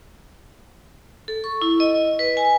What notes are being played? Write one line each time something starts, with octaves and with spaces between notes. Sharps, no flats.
A4
C#6
E4
D#5
B4
G#5